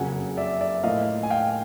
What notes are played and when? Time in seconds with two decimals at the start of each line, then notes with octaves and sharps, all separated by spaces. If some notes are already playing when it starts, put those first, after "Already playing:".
Already playing: F#1 F2 C#3 F#3 F#5 G#5
0.37 D5 E5
0.61 D5 E5
0.83 A2 F3 A#3 D#5 F5
1.23 G#5
1.30 F5 G5